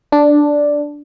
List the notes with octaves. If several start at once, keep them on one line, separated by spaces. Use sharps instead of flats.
D4